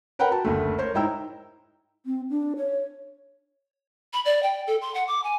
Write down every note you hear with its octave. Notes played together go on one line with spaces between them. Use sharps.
A#4 B4 F#5 G5 A#5 B5
F#4 A5
F#1 D2 A3
A#4 C5 C#5
G#2 D#4 E4 G5 A#5 E6
C4
D4
C#5
B5
D5
G5
A4
C6
F#5
D6
G#5